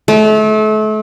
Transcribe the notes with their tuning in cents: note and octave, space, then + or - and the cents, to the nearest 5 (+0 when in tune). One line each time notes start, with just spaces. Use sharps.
A3 -35